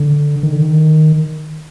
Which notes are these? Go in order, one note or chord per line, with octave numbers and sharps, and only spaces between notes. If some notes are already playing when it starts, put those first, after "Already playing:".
Already playing: D3
D#3
D3
D#3